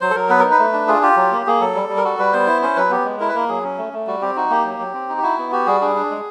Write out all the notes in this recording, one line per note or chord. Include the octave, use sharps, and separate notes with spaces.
F#3 C5
A4
F#3 A#4
B3 B4
D#4 A#4
B4
A3
D4
F4 G#4
F4 G4
F#3
A#3
A#3 G#4
F#3 A4
G3
G3
A#4
F#4 A4
G3 B4
B3 C5
E4
C#4 C5
F#3 B4
B3 G4
G#3
E4 A#4
B4
A#3 A#4
F#3 G#4
C#4
A3
A3
G3 F#4
C4 G4
D#4 F#4
A#3 G4
F#3
F#3
C4
D#4
G4
E4 F#4
B3
F#4 G4
G3 G#4
D4 G#4
D4
G#3